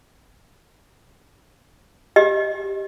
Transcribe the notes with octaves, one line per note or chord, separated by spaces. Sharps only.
G4 D#5